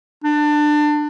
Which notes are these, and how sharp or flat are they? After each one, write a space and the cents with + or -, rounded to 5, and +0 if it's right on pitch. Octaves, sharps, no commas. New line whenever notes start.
D4 +25